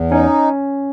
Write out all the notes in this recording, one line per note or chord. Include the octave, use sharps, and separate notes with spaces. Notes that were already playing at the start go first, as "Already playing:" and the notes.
Already playing: E2
C#4 D#4